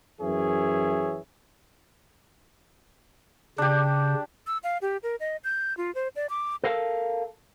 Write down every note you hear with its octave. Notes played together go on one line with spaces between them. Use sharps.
F#2 E3 G#4 C#5 E5
C#3 D4 G4
E6
F5
G4
A#4
D#5
G6
F4
C5
D5
D6
A4 A#4 F5 F#5 A5